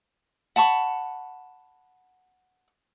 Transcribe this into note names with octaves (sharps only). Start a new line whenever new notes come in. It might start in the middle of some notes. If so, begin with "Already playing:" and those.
F#5 A5 B5 C#6